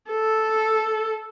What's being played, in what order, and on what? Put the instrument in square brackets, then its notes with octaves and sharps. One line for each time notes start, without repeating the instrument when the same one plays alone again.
[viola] A4